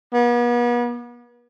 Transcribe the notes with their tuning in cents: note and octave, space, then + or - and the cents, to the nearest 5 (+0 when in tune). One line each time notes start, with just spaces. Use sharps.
B3 -40